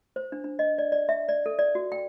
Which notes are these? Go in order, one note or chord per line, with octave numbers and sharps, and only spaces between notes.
C5
D4
D4
D#5
D5
D5
E5
D5
A4
D5
F#4
G5